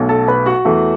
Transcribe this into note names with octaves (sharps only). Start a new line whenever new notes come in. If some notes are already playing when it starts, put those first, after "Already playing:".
Already playing: B1 B2 A3
A4 A5
B4 B5
F#4 F#5
E2 E3 A3